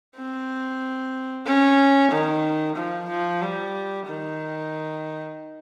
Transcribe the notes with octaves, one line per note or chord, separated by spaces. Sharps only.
C4
C#4
D#3
F3
F3
G3
D#3